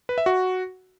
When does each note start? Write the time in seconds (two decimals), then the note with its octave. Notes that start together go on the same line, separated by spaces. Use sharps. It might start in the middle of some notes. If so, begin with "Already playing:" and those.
0.09 B4
0.18 E5
0.26 F#4